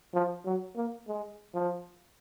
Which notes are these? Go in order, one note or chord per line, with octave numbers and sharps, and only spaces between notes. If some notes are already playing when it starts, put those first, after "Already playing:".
F3
F#3
A#3
G#3
F3